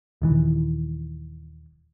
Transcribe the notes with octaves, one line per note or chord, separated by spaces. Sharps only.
D#1 D#3 E3